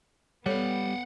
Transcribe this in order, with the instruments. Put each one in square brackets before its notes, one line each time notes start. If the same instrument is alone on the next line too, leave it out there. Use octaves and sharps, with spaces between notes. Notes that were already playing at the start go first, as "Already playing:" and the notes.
[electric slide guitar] G3 [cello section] B3 [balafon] A4 C#5 [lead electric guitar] F5 F#5